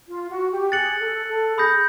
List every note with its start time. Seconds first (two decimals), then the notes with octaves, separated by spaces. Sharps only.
0.08 F4
0.29 F#4
0.51 G4
0.72 G#4 F#6 A6 C#7 F#7
1.00 A4
1.28 A4
1.58 G#4 B5 D#6 G6 A#6